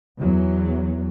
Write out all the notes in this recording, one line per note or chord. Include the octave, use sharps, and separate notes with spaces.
E2 F#3